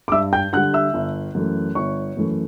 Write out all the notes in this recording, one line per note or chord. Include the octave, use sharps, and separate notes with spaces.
D6
G2 E5 E6
G5 G6
D3 G3 F#5 F#6
E5 E6
G1
F#2 E3 A3
G1 C#5 C#6
F#2 E3 A3